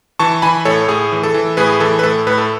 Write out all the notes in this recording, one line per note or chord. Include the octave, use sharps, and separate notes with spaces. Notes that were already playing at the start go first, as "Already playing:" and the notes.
E3 A5 C#6
E3 G#5 B5
A2 A4 C#5
A2 G#4
E3
A4
E3
A2 G#4 B4
E3 A4
B4
A2 A4
A2 B4
A4